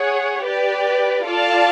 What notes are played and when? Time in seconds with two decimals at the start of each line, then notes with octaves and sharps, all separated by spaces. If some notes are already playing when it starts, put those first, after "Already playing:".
Already playing: G#4 C#5 F#5
0.45 G4 B4 D5
1.26 F4 A4 D5 F5 A5